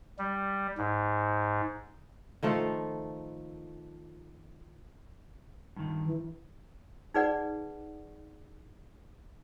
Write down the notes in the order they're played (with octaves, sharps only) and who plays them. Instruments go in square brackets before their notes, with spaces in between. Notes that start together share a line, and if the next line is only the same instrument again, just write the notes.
[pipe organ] G3
G#2
[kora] D#3 F3 A3 F4
[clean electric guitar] G2 D#3
[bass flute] E3
[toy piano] D#4 G#4 B4 D5 F#5